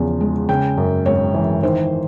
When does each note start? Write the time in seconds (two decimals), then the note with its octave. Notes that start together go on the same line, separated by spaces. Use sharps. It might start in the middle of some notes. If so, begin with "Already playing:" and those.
Already playing: E2 C#3 F3
0.20 G#3
0.49 C#3 G5
0.77 F#2
1.06 G#1 C#5
1.34 E3
1.63 D#3 C5